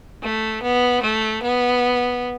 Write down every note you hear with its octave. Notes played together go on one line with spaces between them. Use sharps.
A3
B3
A3
B3